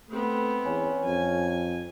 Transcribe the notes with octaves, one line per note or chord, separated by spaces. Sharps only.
A3 B3 C4
E2 C#4
F2 G#5